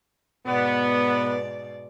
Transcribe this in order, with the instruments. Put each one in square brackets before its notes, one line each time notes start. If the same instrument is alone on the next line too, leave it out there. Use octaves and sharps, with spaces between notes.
[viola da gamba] G#2 B2 D5 [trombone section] B3